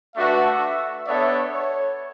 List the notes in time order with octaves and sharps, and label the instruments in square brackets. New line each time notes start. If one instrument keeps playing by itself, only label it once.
[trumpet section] A3 D4 F#4 B4 [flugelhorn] E5
[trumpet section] B3 D4 A4 C#5 E5 [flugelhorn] D5
[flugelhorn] C#5